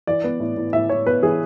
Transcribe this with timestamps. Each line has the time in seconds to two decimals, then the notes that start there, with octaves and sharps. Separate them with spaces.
0.07 E3 D5
0.24 B3
0.40 A2
0.57 A2
0.73 A2 E5
0.89 A2 C#5
1.06 B3 B4
1.22 E3 G#4